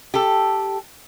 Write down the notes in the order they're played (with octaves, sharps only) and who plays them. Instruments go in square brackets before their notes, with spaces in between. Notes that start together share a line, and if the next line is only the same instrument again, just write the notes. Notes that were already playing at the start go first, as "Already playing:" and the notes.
[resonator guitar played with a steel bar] G4 A4